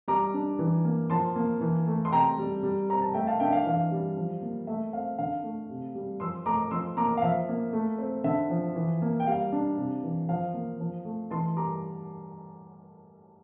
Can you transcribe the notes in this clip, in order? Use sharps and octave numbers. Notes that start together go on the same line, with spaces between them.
G3 A#5 D6
D4
E3
A#3
F3 A5 C6
A#3
E3
A3
C6
C3 G5 A#5
G3
G3
C4 A#5
A5
A3 E5 G5
F5 A5
D4 E5 G5
F5
E3 F5
G3
F3
A#3
A3 E5
C4 F5
D3 F5
A3
C3
G3
F3 C6 E6
A3 A#5 D6
F3 C6 E6
A#3 A#5 D6
F5
F3 E5
A#3
A3
C4
D3 E5
F3
E3
A#3
G5
G3 F5
D4
C3
E3
F3 F5
A#3
F3
A3
E3 A5 C6
G3 A#5 D6